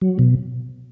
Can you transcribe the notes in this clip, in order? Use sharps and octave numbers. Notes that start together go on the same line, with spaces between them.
F#3
B2